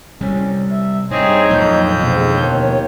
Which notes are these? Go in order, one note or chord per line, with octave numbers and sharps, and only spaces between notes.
C3 G3 C#4
E5
G2 C4 D#4 G#4 C#5
F2 A#2 F#3 A3 G6
G#2 B2 D3 F3
D#2 D#3 C#5